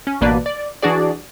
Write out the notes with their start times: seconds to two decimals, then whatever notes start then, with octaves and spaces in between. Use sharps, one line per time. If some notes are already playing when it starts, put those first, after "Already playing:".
0.07 C#4
0.21 A1 B2 A#3 D4 B4 D5
0.46 D5
0.82 E3 D4 F#4 G#4 D5